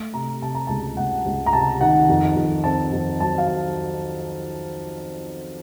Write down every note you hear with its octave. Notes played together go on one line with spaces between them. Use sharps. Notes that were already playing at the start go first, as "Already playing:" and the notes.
Already playing: A3
C3 A#5
C3 A5
A#5
C#2 A5
C#2 F#5
C#2
A#5
C3 A5
D#3 F#5
F2
F2
C4 A5
F2
F#3 A5
F5